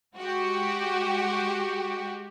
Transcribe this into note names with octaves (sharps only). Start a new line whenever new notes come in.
G#3 F#4 G4